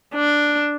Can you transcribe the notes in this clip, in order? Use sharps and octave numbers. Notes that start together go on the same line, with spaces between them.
D4